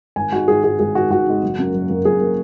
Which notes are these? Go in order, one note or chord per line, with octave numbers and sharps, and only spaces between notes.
G#1 G#5
G#2 G#3 F#4
G#1 G#4
G#2 G#3 G#4
G#1 G#4
G#2 G#3 F#4
G#1 F#4
G#2 G#3
F#1
F#2 F#3 A#3
F#1
F#2 F#3 A#3
F#1 G#4
F#3 A#3